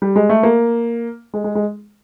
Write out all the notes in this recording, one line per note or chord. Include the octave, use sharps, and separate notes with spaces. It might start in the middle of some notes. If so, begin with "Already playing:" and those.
G3
G#3
A3
A#3
G#3
G#3
G#3